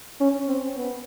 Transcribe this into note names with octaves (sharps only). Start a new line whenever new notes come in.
C#4
C4
B3